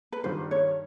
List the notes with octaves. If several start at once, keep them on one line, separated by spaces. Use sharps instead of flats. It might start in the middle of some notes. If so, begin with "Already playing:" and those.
B4
G2 D#3 G3 C5
C#5